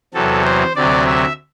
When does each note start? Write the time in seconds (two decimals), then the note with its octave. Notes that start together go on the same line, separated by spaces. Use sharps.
0.14 E2 C3 F#3 A4
0.45 C5
0.76 D2 C3 F#3 D5
1.06 E5